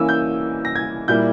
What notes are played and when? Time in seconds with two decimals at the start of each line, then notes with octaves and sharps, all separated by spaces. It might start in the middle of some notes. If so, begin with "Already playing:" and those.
Already playing: E3 A#3 C#4 E4 G#5 E6
0.09 G6
0.65 A#6
0.76 G#6
1.08 A#2 G3 A#3 E4 G6